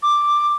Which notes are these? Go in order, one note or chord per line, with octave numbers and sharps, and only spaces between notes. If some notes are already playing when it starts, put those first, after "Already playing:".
D6